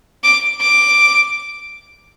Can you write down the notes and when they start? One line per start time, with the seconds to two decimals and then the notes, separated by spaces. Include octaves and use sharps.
0.24 D6
0.61 D6